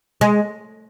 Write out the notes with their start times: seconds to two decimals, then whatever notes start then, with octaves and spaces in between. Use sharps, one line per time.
0.21 G#3